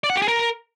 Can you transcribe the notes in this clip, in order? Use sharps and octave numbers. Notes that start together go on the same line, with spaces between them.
D5
F#5
G4
G#4
A#4